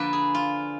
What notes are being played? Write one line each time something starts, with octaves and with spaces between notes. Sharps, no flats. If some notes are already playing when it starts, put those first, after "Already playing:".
Already playing: D3 F3 A#3 D4 B4 D5
G#4
F4